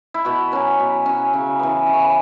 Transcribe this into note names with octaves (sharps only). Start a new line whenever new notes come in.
E4
B2 F#4
F#3 C#4 B4
B2
F#3 C#4
C#3
E3 B3
C#3 E5
C#5
B4